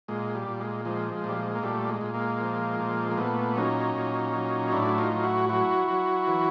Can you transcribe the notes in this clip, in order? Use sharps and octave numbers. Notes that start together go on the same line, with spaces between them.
A#2 G#3
G3
A#2
G#3
F3 G#3
G#3
A#2 G3
G#3
A#3
A#2 G3 A3
G#3
A#2
G#3 A#3
F3
A#2
A#3
A#2 A3 B3
F#3 C#4 D#4
A#2
F#3
A2 D4 E4
D#4 F4
F#3
E4 F#4
F#3 E4 F#4
F#3
E3